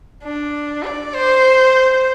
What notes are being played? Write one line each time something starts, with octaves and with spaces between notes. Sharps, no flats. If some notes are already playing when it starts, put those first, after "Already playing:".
D4
D5
C5